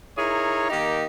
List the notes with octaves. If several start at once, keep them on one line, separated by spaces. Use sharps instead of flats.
D#4 E4 G#4 A#4 C#5
D#3 A#3 D#4 G4